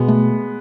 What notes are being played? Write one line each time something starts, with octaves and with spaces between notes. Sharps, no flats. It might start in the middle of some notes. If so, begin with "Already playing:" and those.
Already playing: B2 G#3 B3
A3